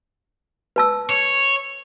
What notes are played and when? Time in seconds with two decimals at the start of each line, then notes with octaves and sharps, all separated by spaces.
0.76 B4 A5 E6
1.10 C#5